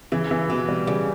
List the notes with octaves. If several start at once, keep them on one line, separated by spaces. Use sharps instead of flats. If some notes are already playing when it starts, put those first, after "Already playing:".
C#3 E3
E3
B2 E3
G3
C#3 G3